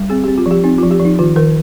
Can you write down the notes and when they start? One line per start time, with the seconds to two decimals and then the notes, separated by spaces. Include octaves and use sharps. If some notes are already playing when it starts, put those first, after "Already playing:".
Already playing: G3
0.10 C4 G#4
0.24 C4 G4
0.38 F4
0.46 F3
0.51 G4
0.64 C4 D#4
0.78 F4
0.83 F3
0.91 G4
1.00 F3
1.05 D#4
1.19 D#3 F4
1.36 D#3 A#4